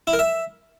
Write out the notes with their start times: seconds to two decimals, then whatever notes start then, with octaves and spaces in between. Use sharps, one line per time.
0.07 E4
0.13 A#4
0.19 E5